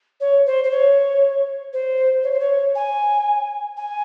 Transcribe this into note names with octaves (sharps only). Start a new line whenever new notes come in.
C#5
C5
C5
C#5
C5
C#5
C5
C#5
G#5
G#5